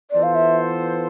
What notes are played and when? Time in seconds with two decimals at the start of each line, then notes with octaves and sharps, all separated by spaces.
0.11 E3 B3 F4 A4 C5 D5
0.23 F5
0.35 E5